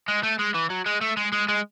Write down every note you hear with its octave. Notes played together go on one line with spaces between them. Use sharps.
G#3
A3
G#3
E3
F#3
G#3
A3
G#3
G#3
G#3